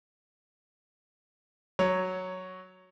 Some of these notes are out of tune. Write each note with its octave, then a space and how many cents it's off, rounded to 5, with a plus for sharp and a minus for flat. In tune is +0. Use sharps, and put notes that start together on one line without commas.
F#3 +0 C#5 +0